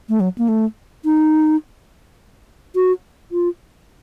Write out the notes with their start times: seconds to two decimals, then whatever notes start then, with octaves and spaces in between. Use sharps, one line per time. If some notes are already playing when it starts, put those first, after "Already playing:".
0.09 A3
0.20 F#3
0.38 A#3
0.49 A3
1.05 D#4
2.75 F#4
3.32 F4